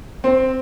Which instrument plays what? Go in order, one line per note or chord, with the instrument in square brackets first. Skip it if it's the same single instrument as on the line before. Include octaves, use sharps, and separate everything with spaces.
[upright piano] C4